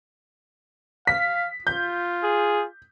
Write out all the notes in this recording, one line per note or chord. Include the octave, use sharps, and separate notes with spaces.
F5 B6
F4 G6
G#4